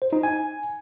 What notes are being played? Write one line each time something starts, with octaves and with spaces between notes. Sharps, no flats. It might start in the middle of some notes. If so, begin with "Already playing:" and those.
C5
D#4
G#5